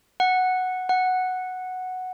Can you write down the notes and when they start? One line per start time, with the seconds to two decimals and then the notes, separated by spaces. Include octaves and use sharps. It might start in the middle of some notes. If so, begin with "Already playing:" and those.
0.20 F#5
0.89 F#5